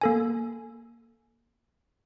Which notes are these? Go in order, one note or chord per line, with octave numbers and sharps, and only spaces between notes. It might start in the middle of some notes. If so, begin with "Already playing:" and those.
A#3 A4 G#5